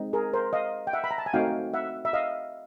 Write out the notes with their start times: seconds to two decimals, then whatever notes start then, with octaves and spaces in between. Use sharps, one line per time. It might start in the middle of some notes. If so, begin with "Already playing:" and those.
Already playing: G#3 C4 D#4
0.13 G#4 A#4
0.33 A#4 C5
0.53 D#5 F5
0.87 G5
0.93 E5 F#5
1.04 B5
1.11 A#5
1.18 A5
1.26 G#5
1.33 A3 C4 D#4 F#4 F5 G5
1.74 E5 F#5
2.05 E5
2.13 D#5 F5